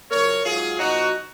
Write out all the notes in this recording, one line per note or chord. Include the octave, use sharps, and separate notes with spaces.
F#2 C#3 F3 A#4 C#5
G#2 F#3 F4 G#4
A#2 F3 D#4 F#4